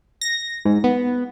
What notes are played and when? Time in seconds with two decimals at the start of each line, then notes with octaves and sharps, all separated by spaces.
0.21 A#6
0.65 G#2
0.84 B3